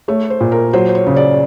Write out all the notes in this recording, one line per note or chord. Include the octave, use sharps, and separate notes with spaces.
A3 C#5
C5
A#2
A#4
F#3 C5
C5
C#5
C#3
D5